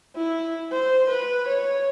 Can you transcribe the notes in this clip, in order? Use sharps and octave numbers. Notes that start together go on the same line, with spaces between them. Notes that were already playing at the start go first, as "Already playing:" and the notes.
E4
C5
B4
C#5